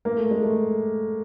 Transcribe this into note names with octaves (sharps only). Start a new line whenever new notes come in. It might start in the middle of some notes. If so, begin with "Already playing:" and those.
A#3
A3
G#3
A3